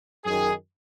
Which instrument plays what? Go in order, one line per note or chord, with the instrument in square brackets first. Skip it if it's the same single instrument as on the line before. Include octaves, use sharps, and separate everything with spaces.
[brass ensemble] F#2 D#3 G#4